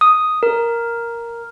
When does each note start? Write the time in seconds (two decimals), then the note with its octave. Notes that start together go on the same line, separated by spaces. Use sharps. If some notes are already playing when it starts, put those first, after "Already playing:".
0.01 D#6
0.43 A#4